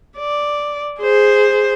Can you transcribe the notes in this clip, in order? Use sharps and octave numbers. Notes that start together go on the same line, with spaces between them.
D5
G#4 C5